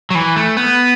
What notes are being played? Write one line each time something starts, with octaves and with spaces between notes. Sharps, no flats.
F#3
E3
A3
B3